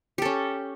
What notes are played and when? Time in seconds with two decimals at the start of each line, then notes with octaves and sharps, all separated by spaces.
0.18 G4
0.22 A4
0.25 C#4